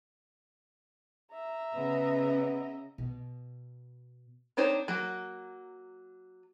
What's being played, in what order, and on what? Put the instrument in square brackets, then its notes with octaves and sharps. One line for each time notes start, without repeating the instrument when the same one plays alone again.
[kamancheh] E5 A#5
[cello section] C#3 D#5 [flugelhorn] B3
[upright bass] B2
[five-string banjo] C4 D4 D#4 C5 C#5
F#3 A#3